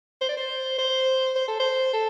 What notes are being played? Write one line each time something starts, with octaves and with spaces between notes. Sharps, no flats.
C5
D5
C5
C5
C5
A4
C5
A4